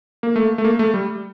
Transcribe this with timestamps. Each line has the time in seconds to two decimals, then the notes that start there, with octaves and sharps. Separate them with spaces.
0.23 A#3
0.36 A3
0.58 A3
0.64 A#3
0.79 A3
0.94 G3